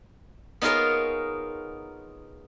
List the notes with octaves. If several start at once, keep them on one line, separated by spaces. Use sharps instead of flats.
B3 D#4 F4 G#4 A#4 C#5